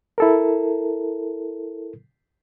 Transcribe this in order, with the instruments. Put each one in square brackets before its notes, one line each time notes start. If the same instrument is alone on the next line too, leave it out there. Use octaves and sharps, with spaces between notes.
[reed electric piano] E4 A4 A#4